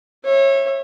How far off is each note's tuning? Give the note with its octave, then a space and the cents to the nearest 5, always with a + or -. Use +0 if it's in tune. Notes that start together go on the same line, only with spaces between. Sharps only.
C#5 -30 E5 +5